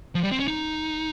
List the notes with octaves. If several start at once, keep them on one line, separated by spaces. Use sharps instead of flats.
F3
G3
C4
C#4
D#4